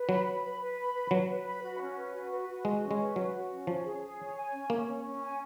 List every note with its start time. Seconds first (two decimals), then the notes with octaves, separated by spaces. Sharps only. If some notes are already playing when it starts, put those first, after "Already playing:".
Already playing: B4
0.09 F#3 B5
0.26 B5
0.43 B4
0.60 B4
0.77 B5
0.94 B4
1.11 F#3 B4
1.29 B4
1.45 B5
1.63 F#4
1.80 C#4
1.97 B4
2.13 F#4
2.31 B4
2.48 F#4
2.64 G#3 D#5
2.82 C#4
2.91 G#3
2.99 B4
3.16 F#3 F#4
3.34 F#4
3.51 C#4
3.67 F3 C#5
3.84 G#4
4.01 G#4
4.18 C#5
4.36 G#5
4.53 C#4
4.70 A#3 C#4
4.87 C#4
5.03 C#4
5.22 G#5